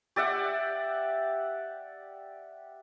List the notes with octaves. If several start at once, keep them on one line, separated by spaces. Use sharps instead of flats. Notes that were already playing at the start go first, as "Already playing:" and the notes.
G4 D5 E5 F#5